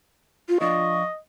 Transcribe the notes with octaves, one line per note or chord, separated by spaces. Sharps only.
F4
F3 D4 F4 D#5 C#6